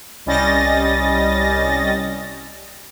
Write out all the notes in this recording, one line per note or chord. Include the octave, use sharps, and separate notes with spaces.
C2 G3 C#4 D#5 A6 A#6